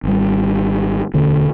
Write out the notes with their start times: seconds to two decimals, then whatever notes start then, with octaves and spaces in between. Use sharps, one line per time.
0.03 G#1 G3
1.14 E1 D2 D3 C#4